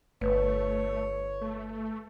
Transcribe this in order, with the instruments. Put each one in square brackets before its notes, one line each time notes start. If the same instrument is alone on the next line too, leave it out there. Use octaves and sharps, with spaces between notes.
[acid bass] G1 [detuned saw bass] A3 [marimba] B4 [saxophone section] C#5
[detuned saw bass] A3